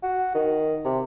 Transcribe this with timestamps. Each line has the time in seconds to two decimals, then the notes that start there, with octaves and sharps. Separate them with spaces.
0.03 F#4
0.34 D#3
0.85 C3